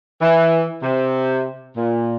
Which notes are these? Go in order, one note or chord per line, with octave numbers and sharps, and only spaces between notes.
E3
C3
A#2